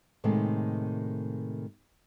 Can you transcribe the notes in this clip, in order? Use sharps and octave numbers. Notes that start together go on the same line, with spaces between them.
A2 C3 D#3 G#3 A3